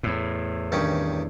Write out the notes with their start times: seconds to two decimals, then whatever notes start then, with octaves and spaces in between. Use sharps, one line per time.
0.03 E2 A2
0.72 G2 D#3 C#4